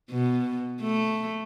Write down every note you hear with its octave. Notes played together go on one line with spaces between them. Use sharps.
B2
A3